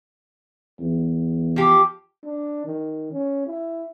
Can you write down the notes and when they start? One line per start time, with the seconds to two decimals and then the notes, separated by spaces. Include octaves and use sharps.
0.80 E2
1.56 F3 G4
2.25 D4
2.65 D#3
3.11 C#4
3.47 E4